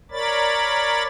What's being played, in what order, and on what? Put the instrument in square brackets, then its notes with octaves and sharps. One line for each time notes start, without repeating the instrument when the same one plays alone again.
[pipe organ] A#4 C#5 D5 B5 A6